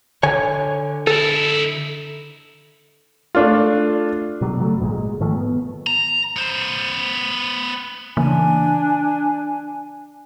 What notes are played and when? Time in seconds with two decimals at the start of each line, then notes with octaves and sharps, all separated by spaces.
0.23 D3 C#5 G#5
1.07 D#4 E4 A4
3.35 A3 D4 F4
4.41 B2 F#3 G3
4.60 C#3 F#3 G3 A3
4.80 G#1 A#2 D#3 G#3
4.93 G#3
5.20 G#2 D#3 F3 A3
5.35 B3
5.87 A#5
6.37 B3 C5
8.17 C#3 E3 A#3 D4 G#5